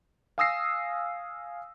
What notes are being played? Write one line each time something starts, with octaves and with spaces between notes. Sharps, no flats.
F5 G#5 D#6 E6 A#6 C7